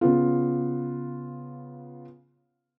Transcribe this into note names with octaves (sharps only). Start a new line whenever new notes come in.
C#3 B3 F4